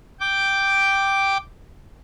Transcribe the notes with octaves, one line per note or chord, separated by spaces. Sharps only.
G5 D6